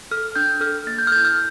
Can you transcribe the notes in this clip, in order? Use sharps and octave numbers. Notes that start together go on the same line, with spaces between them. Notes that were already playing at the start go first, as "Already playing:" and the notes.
A4 F6
D4 G6
A4 F6
A#3 A6
G6
F6
E4 A4 G6
F6